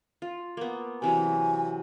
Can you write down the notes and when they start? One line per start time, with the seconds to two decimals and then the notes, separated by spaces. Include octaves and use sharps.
0.22 F4
0.57 A#3 B3
1.02 C3 E3 F#3 G#5